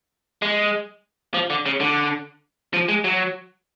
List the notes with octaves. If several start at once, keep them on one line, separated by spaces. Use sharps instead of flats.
G#3
F3
D3
C#3
D3
F3
G#3
F#3